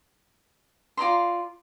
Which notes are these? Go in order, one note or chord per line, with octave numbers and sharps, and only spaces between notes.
F4 D5 A#5 C6